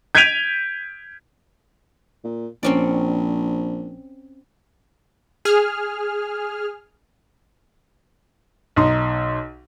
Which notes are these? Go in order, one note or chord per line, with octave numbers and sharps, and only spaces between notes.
G6 G#6 B6 D7 D#7 F7
A#2
A#1 C4 C#4 D5
G#4 F6
B1 D#4 C6